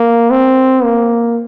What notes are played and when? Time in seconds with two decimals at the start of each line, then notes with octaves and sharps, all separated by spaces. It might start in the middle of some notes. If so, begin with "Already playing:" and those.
Already playing: A#3
0.31 C4
0.83 A#3